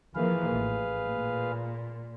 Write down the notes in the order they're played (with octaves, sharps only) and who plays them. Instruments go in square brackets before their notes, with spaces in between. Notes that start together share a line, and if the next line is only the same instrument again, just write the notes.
[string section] E3 F3 A#3 [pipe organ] G#4 B4 F5
[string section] A1
A#2